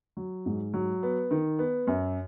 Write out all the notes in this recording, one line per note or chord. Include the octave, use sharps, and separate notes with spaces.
F#3
G#2
F#3
B3
D#3
B3
F#2